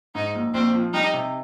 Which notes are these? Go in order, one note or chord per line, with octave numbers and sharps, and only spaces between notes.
G#2 D#4
A#1
A#1 C4
F3
G3 D#4
C3